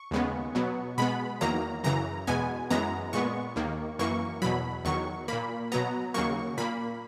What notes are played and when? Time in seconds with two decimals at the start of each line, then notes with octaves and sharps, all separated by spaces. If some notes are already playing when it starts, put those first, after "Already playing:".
Already playing: C#6
0.11 D#2 C#3 G#3 B3
0.55 B2 F#3 B3
0.98 B2 G#3 B3 B5
1.41 E2 D#3 F#3 A#3 A#5
1.84 F#2 C#3 E3 A#5
2.27 E2 B2 G#3 B3 G#5
2.70 F#2 E3 G#3 B3 A#5
3.13 A#2 G#3 B3 C#6
3.56 D#2 D#3 A#3
3.99 F#2 E3 A#3 C#6
4.42 E2 B2 F#3 B5
4.85 E2 D#3 F#3 C#6
5.28 A#2 A#3 B5
5.72 B2 F#3 B3 A#5
6.14 D#2 C#3 F#3 A#3 C#6
6.58 A#2 A#3 B5